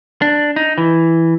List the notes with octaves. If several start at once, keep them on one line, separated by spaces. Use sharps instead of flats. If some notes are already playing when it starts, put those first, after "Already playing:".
D4
D#4
E3